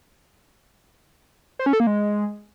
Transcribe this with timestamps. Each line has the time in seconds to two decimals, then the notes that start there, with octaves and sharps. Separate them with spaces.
1.59 C5
1.66 C#4
1.73 A4
1.80 A#3
1.87 G#3